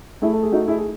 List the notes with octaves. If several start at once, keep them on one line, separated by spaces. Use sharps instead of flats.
A3 E4 G#4
A4
G#4
A3 D#4 F#4
E4 G#4
G#4